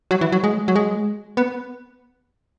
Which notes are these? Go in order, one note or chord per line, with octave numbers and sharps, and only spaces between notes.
F#3
E3
F#3
G#3
F#3
G#3
B3